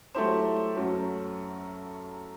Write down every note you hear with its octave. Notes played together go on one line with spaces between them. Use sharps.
F#3 A3 E4 G4 C5
F#2 F#3 A3